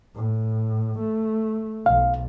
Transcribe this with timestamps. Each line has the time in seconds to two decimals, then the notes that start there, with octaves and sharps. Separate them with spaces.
0.15 A2
0.99 A3
1.86 B1 F5